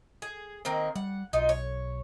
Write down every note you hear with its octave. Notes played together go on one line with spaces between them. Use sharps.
G#4
D#3 A#3 C4
G3 F#5
B1 D#4 F4
C#5